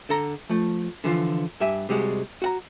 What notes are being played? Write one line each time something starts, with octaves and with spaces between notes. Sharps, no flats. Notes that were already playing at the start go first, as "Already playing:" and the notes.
D3 A4 A#5
F3 A3
D3 E3 F3 F4
G2 G4 E5 G#5
C3 G3 G#3 F#4
F#4 F#5 A#5